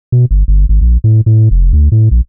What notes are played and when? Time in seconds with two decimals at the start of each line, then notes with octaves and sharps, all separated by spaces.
0.12 B2
0.31 G1
0.48 G1
0.69 G#1
0.81 A#1
1.04 A2
1.26 A2
1.51 F1
1.73 D2
1.92 A2
2.11 A#1